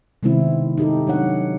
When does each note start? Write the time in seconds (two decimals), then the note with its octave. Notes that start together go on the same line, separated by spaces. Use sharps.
0.23 C3 D#3 G#3 B3 C4 E4
0.78 D#4 G4 A4
1.07 F#3 D4 C#5 F#5